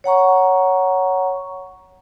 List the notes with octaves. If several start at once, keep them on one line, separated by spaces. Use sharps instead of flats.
C#5 F#5 A#5 C#6